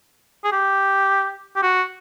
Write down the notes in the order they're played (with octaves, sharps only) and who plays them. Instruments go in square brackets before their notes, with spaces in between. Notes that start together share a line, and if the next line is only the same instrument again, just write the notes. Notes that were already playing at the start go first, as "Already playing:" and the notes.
[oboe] G#4
G4
G4
F#4